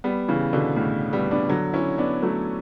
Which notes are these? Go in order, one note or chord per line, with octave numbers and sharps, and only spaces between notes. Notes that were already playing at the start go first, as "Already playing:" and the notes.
G3 B3
C#3 E3
B2 D3
A2 C#3
G3 B3
B3 D4
D3 F#3
C#4 E4
B3 D4
F#3 A3